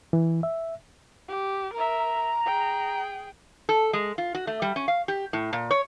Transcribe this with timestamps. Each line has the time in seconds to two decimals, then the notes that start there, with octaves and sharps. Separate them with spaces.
0.13 E3
0.43 E5
1.29 G4
1.74 A#4 E5 A#5
2.46 G#4 G5
3.69 A4
3.93 G#3
4.18 F4
4.35 F#4
4.47 A3
4.62 G3
4.76 C#4
4.88 F5
5.08 G4
5.33 A2
5.53 A#2
5.71 C#5